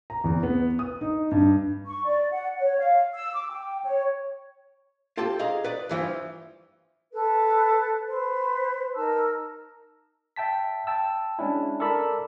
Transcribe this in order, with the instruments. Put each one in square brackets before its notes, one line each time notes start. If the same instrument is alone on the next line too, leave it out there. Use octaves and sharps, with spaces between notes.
[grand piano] A#5
E2
B3
D#6
D#4
G2
[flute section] C#6
D5
F#5
C#5
F5
E6
D6
G5
C#5
[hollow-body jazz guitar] F4 G4 A4 A5
G#4 D#5 F5 A#5
B4 D5
G2 E3 F3
[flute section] A4 B4
B4 C5
D#4 A#4 A5 E6
[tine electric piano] E5 G5 A5 B6
G5 A5 E6
G#3 C#4 D4 E4
A4 A#4 D5 B5 E6